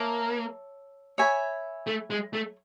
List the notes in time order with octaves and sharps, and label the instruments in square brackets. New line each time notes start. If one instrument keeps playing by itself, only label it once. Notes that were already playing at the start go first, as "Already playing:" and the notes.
Already playing: [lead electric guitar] A#3 [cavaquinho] C#5 E5 A5
[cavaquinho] C#5 E5 G#5 B5
[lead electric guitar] A3
G#3
A3